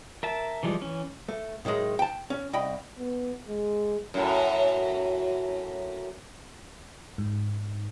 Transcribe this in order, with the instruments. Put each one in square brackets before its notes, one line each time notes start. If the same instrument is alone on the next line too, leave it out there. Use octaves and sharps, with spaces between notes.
[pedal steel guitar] A#4 E5 A5
E3 F3 G3 G#3
E3 C#4
[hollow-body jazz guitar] A3
A2 D#3 F#3 G#3
G5 A5
C#4
C2 D#5 G5 B5
[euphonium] B3
G#3
[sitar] F#2 A2
[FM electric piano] G#2